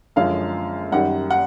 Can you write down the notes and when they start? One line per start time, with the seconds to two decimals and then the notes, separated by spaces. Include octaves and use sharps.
0.16 F#2 D3 F3 G#3 C#4 F5
0.92 F#2 D#3 G3 F#5
1.31 F#5